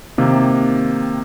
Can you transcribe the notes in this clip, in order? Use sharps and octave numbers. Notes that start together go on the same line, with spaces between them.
C3 D#3 A#3